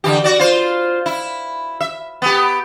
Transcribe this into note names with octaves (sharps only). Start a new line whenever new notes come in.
D3 E3 G4
F#4 D5
F4 C5
E4
E5
B3 G4